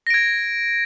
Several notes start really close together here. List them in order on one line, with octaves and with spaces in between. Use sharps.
A#6 D7 G#6